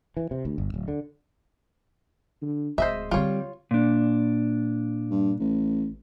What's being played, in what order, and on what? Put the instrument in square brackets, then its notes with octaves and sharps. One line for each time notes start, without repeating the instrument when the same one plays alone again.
[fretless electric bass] E3
C3
D2
G1
D1
D3
[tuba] D3
[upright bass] D1 [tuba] G#3 [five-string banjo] C5 D#5 E5
[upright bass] D3 C4 [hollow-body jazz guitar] G3 [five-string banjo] F4 C#5
[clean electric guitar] A#2 D4
[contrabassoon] G2
A1